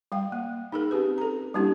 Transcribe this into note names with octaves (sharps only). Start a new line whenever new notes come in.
G3 F5 G5
A#3
D#4 G#4 A#4
C4 C#4 G4 B4
A4 A#5
G3 A#3 C#4 D4 E4 G4